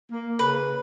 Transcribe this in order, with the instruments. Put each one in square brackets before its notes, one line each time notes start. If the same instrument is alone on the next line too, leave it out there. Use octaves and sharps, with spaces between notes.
[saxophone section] A#3
[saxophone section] C#3 [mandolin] B4